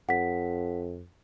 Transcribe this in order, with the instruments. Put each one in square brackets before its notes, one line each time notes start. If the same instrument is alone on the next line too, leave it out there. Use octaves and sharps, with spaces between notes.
[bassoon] F2 [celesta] F#5 B6